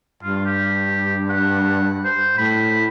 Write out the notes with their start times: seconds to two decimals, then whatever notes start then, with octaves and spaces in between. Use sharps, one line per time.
0.23 G2 F4
0.46 G4
1.30 F#5
2.05 C5
2.37 A2 B5